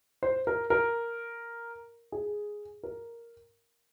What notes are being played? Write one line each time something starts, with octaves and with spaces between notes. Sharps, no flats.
C5
A#4
A#4
G#4
A#4